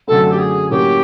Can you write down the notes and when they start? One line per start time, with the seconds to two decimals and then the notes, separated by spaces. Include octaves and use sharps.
0.08 F#2 D3 F#3 A3 C4 A4
0.31 G4
0.39 G#4
0.69 A2 F#3 A#3 C#4 G4